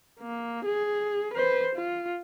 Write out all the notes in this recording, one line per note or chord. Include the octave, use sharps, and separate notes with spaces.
A#3
G#4
B4 C5
F4